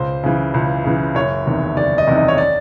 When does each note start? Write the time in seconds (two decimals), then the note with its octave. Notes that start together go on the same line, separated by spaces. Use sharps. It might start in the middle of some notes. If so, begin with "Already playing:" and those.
Already playing: C#2 C5
0.23 C#3 E3
0.54 C#2
0.84 C#3 E3
1.15 F#1 C#5
1.46 E2 C3 D#3
1.77 F#1 D5
1.98 D#5
2.07 E2 C3 D#3
2.17 D#5
2.28 C#5
2.38 D5